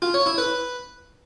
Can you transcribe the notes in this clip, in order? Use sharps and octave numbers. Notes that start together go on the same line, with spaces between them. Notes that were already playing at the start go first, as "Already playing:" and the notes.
F4
C#5
E4
B4